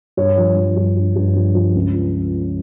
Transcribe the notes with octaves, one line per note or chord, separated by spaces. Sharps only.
G2 C#5
F3
F3
G2
G2
G2
F3
F3
C#2